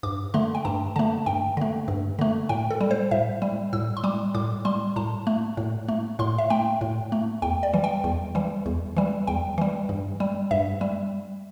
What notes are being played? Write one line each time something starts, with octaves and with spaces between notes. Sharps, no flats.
G2 D6
D3 A3 C6
G5
G2 A5
D3 A3 A5
G2 G5
D3 A3
G2
D3 A3
A2 G5
A4
G3
C5
A2 E5
G3
A2 E6
C6
G3 D6
A2 D6
G3 C6
A2 A5
A3
A2
A3
A2 C6
E5
A3 G5
A2
A3
E2 G5
D5
E3 G3
G5
E2
E3 G3
E2
E3 G3
E2 G5
E3 G3
G2
G3
G2 E5
G3